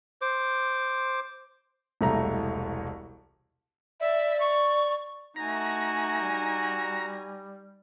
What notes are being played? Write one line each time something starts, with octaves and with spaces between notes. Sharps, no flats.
C5 D6
E1 C2 A3 A#5
D5 E5
C#6
A3 D#4 F#4 G#5 A#5
G3